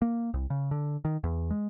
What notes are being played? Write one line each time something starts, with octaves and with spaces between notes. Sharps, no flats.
A#3
C2
C#3
D3
D#3
E2
G#3